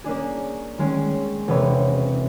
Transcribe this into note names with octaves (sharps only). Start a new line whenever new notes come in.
A#3 C#4 D4 G#4
D#3 G#3 C#4
E1 C3 E3 B4 C#5